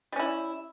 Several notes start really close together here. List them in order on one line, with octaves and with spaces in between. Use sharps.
G3 C#4 E4